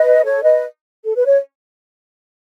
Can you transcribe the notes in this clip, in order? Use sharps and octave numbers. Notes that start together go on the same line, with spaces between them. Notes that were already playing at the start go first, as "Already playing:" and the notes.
Already playing: B4 D#5
A4 C#5
B4 D#5
A4
B4
C#5